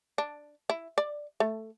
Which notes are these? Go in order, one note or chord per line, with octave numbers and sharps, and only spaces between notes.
D4
E4
D5
A3